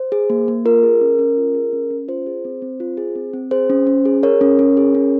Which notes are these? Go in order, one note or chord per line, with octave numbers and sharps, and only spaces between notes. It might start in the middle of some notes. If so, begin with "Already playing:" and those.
Already playing: C5
G#4
A#3
A#3
F4 A#4
G#4
C#4
C#4
F4
G#4
C#4
C#4
F4 C5
G#4
C4
C4
F4
G#4
C4
C4
G#4 C5
C#4
C#4
G#4
G#4 A#4 C#5
C#4
C#4
G#4
C#4